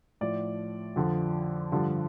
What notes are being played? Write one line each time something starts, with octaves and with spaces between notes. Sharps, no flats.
A2 F3 D5
F2 D3 F3
G2 D3 F3